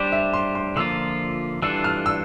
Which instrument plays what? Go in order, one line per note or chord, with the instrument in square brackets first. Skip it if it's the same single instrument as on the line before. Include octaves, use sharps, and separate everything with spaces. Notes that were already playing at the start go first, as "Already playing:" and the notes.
Already playing: [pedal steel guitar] G3 D4 G4 C5 [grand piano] D5
[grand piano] E5
C6
C6
[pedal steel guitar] D3 F3 A#3 F4 [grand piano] E6
[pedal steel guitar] E3 G3 D4 F4 A4 [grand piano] E6
[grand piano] F6
E6